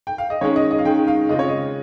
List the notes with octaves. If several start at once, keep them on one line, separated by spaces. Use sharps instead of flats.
G5
F5
D#5
D#3 G#3 C#4 C#5
D#5
D#5
F5
D#3 G#3 C#4 G5
F5
C#3 G#3 C4 F4 D#5
C#5
D#5